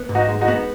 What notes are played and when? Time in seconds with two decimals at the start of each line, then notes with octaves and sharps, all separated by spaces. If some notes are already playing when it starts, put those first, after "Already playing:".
Already playing: B3
0.09 G#2
0.15 D#4 F#4
0.29 G#3
0.41 D#4 F#4
0.48 B3